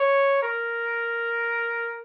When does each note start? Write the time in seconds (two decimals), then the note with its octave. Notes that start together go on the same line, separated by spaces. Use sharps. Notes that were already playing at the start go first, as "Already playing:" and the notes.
Already playing: C#5
0.43 A#4